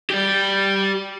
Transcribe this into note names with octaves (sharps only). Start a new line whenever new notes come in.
G4 D5